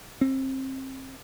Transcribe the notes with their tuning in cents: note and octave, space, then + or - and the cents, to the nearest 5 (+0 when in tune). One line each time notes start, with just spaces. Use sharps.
C4 +30